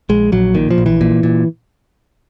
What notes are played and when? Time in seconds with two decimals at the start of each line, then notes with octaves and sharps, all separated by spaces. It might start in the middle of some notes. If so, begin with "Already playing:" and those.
0.09 A#1 G#3
0.32 A#1 F#3
0.55 A#2 D#3
0.71 F3
0.78 A#1
0.86 E3
1.01 A#2
1.23 A#2